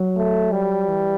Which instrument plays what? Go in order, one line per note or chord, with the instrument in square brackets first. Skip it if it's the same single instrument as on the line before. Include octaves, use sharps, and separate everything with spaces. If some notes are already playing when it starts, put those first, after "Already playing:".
Already playing: [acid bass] F#3
[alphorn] A3
G3
[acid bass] E3